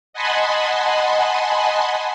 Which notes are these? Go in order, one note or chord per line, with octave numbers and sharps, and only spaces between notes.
D#5 F#5 G#5 A5 B5 C6